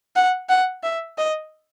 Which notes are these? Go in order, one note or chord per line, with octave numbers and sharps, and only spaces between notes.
F#5
F#5
E5
D#5